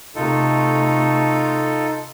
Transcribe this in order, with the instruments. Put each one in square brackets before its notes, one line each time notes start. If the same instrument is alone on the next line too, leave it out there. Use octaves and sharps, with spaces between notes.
[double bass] C3 A3 [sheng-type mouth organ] D#4 F4 A4